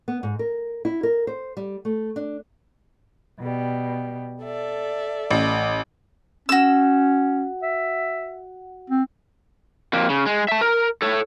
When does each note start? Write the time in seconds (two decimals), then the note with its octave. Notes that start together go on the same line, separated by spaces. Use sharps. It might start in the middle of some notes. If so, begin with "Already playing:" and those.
0.08 B3
0.23 G#2
0.39 A#4
0.85 E4
1.03 A#4
1.27 C5
1.57 G3
1.85 A3
2.16 D4
3.39 B2 G3
4.43 A4 D5 E5
5.31 A1
6.49 C#4 F#4 E6
7.63 E5
8.90 C4
9.93 F2 A#3
10.10 C#3
10.26 G#3
10.48 E5 A5
10.61 A#4
11.02 A4 C#5